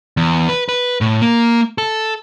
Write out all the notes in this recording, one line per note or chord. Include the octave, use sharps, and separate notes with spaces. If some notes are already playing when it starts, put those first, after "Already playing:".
E2
B4
B4
A2
A#3
A4